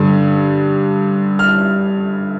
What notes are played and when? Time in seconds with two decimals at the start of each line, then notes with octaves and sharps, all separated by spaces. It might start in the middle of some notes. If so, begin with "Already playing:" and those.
Already playing: G2 D3
1.39 F6